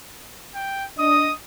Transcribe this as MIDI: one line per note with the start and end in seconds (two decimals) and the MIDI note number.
0.55 0.85 79
0.99 1.29 62
0.99 1.29 75
0.99 1.34 87